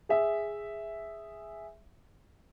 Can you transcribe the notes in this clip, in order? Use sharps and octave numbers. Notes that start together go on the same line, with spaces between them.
G#4 E5